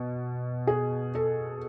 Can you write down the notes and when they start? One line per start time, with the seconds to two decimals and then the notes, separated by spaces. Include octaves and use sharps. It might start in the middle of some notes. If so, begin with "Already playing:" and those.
Already playing: B2
0.67 G#4
1.15 A4